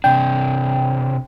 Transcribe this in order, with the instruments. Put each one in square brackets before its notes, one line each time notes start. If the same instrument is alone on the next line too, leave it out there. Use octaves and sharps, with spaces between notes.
[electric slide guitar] C3 D4 [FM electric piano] G5